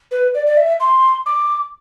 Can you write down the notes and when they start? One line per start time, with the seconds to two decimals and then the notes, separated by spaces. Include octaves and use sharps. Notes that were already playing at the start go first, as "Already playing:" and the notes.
0.11 B4
0.34 D5
0.47 D5
0.57 E5
0.80 C6
1.26 D6